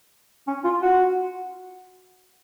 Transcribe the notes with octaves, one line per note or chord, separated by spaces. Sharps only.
C#4
F4
F#4